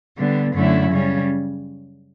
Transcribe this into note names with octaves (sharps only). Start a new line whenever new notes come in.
D3 G3 B3
F#2 D3 A3 C#4 E4
C#3 G3 C#4